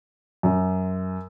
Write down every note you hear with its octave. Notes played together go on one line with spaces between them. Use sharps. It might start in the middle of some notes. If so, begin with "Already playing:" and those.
F#2